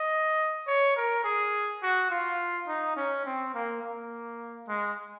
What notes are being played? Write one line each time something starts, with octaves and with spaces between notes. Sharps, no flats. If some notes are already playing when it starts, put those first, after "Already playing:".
Already playing: D#5
C#5
A#4
G#4
F#4
F4
D#4
C#4
C4
A#3
A#3
G#3